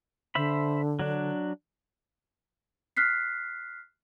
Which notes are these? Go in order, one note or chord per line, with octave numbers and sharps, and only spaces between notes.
D3 C5 E5 B5
F#3 D4
F6 F#6 B6 C7